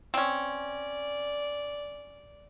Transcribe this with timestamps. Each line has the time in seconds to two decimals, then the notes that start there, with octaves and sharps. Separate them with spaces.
0.14 C4 C#4 D5